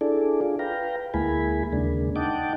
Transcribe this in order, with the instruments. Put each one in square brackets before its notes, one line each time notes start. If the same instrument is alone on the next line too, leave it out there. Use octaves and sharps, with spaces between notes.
[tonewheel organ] D4 E4 G#4 A4 D5
F4 G#4
B4 F5 G5 A#5
D2 G#3 A#3 E4 G#5 B5
D#2 C#3 G#3 A#3 D4
D#4 D#5 F#5 G5 A5 D6